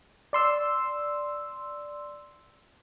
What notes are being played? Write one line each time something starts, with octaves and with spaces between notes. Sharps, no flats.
D5 C6 E6